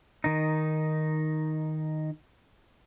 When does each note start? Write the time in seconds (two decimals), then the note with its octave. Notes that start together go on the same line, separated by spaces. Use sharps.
0.24 D#3 D#4